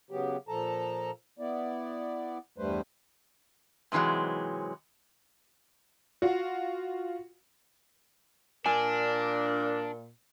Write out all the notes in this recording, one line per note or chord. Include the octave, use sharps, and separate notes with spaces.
C#3 F#3 B3 G4
A#2 F3 A4 A5 A#5
B3 E4 D5
E2 G2 G3 A3 B4 C5
G#2 C3 E3 F#3 G#3
F4 F#4
A#2 D4 A#4 G#5